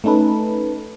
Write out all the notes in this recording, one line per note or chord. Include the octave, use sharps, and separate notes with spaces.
A3 C#4 D#4 A4 B4